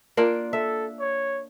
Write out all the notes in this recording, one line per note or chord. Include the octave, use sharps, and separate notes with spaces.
A#3 D4 F4
A4 E5
C#5